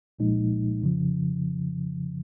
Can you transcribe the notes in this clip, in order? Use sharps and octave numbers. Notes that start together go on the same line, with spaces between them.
C2 A#2 F3 G#3 D#4
F2 C#3 F3